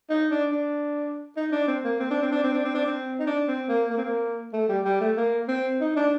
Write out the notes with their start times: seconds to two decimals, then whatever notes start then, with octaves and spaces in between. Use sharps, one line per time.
0.10 D#4
0.31 D4
0.51 D4
1.37 D#4
1.53 D4
1.68 C4
1.84 A#3
2.00 C4
2.11 D4
2.22 C4
2.32 D4
2.43 C4
2.53 D4
2.65 C4
2.75 D4
2.86 C4
3.19 D#4
3.27 D4
3.48 C4
3.69 A#3
3.90 A#3
3.98 C4
4.05 A#3
4.53 A3
4.69 G3
4.85 G3
5.01 A3
5.17 A#3
5.48 C4
5.81 D#4
5.96 D4